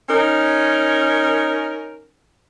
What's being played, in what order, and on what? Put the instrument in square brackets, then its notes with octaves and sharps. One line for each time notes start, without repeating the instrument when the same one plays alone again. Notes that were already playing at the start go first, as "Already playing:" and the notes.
[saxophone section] C#4 D#4 A#4